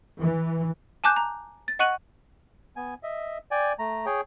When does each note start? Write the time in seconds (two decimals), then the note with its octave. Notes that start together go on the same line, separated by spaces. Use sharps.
0.18 E3
1.04 G#5 A5 D6 F#6 G6
1.16 A#5
1.68 A6
1.79 D#5 F#5 C#6 F#6 D#7 F#7
2.76 B3 G#5
3.03 D#5 E5
3.51 D5 G5 G#5
3.79 A3 A#5
4.06 G#4 C#5 G5